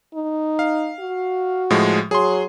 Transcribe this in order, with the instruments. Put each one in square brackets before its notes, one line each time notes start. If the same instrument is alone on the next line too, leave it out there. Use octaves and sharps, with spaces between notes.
[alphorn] D#4
[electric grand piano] F5
[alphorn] F#4
[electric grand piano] A2 F3 G#3
[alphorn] F#3 [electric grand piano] G#4 C6